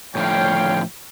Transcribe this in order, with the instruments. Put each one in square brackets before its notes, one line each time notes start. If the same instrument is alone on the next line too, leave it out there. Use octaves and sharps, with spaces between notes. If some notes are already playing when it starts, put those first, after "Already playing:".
[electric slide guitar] A2 D3 F3 [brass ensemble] C#5 F5 G5